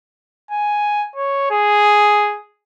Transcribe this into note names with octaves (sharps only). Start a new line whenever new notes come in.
G#5
C#5
G#4